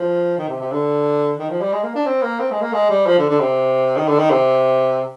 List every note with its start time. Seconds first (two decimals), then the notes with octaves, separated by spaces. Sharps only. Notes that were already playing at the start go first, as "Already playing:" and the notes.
Already playing: F3
0.38 D#3
0.49 C3
0.61 C3
0.72 D3
1.39 D#3
1.50 F3
1.61 G3
1.73 G#3
1.83 A#3
1.95 D4
2.06 C4
2.23 A#3
2.40 C4
2.51 G#3
2.62 A#3
2.73 G#3
2.90 G3
3.06 F3
3.18 D3
3.29 D3
3.40 C3
3.97 D#3
4.08 D3
4.19 D#3
4.31 C3